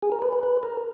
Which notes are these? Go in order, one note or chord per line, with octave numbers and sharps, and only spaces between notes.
G#4
A#4
B4
B4
B4
A#4